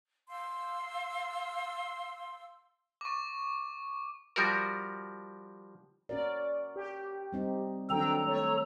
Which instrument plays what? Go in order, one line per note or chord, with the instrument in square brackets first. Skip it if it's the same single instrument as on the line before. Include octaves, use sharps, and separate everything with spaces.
[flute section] F5 C6 E6
[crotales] C#6 D6
[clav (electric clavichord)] F3 G3 F#4 A#4
[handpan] C#4 F#4 A#4 [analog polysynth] D5
[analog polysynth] G4
[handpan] G3 C4 D#4
[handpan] D#3 F#3 C4 [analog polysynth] D4 F#4 G5 [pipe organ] A4 A#5
[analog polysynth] A3 C#5